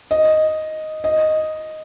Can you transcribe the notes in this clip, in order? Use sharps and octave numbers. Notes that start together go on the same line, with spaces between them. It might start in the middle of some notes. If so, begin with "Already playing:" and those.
D#5
D#5